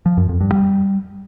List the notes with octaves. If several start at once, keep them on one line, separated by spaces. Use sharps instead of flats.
F3
F#2
F2
G2
G3